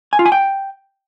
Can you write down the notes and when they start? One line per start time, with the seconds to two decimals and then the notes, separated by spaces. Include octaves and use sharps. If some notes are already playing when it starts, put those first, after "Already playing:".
0.13 G#5
0.19 F4
0.26 G#5
0.32 G5